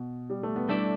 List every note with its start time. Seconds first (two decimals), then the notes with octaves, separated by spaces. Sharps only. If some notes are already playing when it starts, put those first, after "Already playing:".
Already playing: B2
0.30 G3
0.43 A3
0.56 B3
0.69 G3 A3 D4 E4 A4 D5